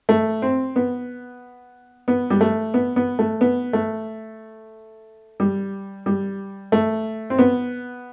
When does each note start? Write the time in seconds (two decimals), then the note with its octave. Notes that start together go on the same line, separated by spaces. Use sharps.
0.09 A3
0.42 C4
0.76 B3
2.08 B3
2.30 G3
2.41 A3
2.74 B3
2.96 B3
3.19 A3
3.41 B3
3.73 A3
5.40 G3
6.06 G3
6.72 A3
7.30 C4
7.39 B3